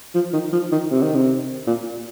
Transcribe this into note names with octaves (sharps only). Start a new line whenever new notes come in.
F3
D#3
F3
D#3
C3
D#3
C3
A#2